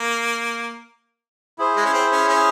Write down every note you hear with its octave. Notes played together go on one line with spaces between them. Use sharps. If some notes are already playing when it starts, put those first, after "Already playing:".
Already playing: A#3
E4 G#4 C5
G#3
C#4
C4
C#4
C#4